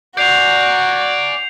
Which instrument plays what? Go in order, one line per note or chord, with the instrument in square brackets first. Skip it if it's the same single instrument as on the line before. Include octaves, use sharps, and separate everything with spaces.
[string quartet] F#4 [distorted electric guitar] D5 G#5 [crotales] G6 C7 F7